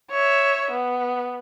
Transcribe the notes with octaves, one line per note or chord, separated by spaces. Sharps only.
C#5 E5
B3